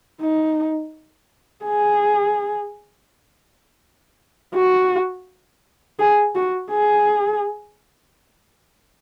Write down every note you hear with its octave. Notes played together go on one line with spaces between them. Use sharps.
D#4
G#4
F#4
G#4
F#4
G#4